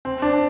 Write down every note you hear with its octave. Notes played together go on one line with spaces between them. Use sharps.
C4
D4